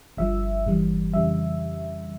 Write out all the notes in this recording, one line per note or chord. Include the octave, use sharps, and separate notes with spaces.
G1 G2 F3 E5
G1 G2 E3 G3
F2 C#3 E3 G3 E5